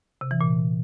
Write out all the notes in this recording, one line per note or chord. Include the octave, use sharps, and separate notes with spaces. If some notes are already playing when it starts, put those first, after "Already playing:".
C3
E3
A#2